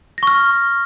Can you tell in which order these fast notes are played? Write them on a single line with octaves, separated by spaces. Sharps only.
A#6 C#6 F6